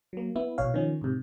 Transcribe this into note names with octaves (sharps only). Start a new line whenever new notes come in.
F#3 A#3
B3 E4
A#1 B2 C#5 F5
D#3 F3 C#4
G#2 C3